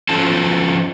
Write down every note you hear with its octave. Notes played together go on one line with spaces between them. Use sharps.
F3 C#4 F4 A4 C5 A5